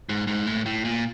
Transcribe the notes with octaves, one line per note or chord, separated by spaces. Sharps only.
G#2
G#2
A2
A2
A#2